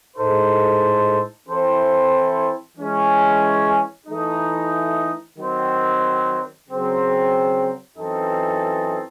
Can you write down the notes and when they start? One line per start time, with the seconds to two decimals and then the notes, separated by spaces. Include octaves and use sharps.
0.17 A2 G#3 D#4 A4 C5
1.47 E3 C4 E4 A4 C5
2.76 E3 G#3 C#4
4.07 E3 A3 D#4
5.37 D#3 F#3 C4
6.67 C#3 F#3 C4
7.97 F#2 E3 C4 D#4 A4